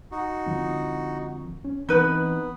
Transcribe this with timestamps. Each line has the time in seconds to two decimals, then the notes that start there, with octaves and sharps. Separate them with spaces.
0.11 D#4 F#4
0.46 D3 F3 C4
1.64 C#4
1.89 E3 B3 C4 D#4 B4